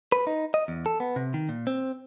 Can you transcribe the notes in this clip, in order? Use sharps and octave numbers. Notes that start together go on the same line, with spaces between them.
B4
D#4
D#5
E2
A4
B3
C3
D#3
A#2
C4